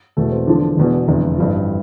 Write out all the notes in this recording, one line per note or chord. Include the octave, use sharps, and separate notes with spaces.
E1 E2 B2 A3
C4
E1 E2 D3 F3 D4
E1 E2 B2
F1 E2 D3
A1 G2 F3